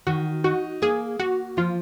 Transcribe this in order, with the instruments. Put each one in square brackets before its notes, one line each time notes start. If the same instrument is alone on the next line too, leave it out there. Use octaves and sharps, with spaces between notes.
[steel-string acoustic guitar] D#3 [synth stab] F#4
[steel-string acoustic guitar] D#4 [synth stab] F#4
[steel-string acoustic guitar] A#3 [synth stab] G#4
[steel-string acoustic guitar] A#3 [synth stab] F#4
[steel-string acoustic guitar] F3 [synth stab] F4